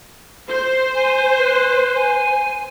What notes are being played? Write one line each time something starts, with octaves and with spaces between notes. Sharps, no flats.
C5
G#5
B4
G#5